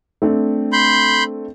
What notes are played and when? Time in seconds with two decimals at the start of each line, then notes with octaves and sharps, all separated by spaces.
0.22 A3 C4 D4
0.73 B5 C6 G6